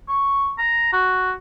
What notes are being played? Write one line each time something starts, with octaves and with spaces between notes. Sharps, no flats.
C#6
A#5
F#4